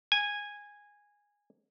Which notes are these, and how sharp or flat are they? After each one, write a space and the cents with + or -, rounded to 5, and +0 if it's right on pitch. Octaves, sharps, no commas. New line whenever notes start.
G#5 -10